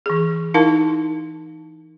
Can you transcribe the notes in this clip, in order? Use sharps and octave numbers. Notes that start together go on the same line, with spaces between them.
E3 G#4
D#4 E4 A#4 F5 A5